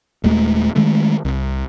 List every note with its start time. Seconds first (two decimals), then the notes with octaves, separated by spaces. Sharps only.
0.24 D#1 D#2 G#3 A3
0.76 D#3 G#3 A3
1.25 C2